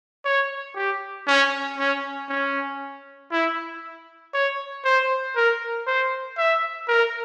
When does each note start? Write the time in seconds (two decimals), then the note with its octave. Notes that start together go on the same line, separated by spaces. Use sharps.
0.25 C#5
0.75 G4
1.27 C#4
1.78 C#4
2.29 C#4
3.31 E4
4.33 C#5
4.84 C5
5.36 A#4
5.86 C5
6.37 E5
6.88 A#4